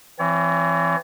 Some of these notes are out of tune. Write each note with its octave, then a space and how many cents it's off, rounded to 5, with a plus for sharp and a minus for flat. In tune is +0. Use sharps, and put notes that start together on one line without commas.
E3 +30 C4 +5 C#5 +40